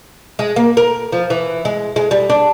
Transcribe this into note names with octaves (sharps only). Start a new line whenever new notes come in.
G#3
A#3
A#4
F3
E3
G#3
G#3
G3
D4